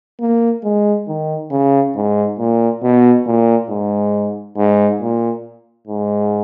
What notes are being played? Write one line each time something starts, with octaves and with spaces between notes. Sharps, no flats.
A#3
G#3
D#3
C#3
G#2
A#2
B2
A#2
G#2
G#2
A#2
G#2